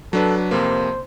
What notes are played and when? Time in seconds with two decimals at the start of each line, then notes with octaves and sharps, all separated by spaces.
0.13 F#3 D4 A4 B4
0.51 F2 C3 A#3 C5